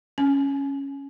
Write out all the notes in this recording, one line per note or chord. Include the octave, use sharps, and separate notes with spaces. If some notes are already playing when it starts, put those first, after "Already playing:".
C#4